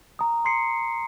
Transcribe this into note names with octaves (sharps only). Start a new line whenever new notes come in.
A#5 D#6
C6 C7 C#7